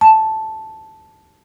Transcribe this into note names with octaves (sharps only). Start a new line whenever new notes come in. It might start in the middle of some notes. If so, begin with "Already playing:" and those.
A5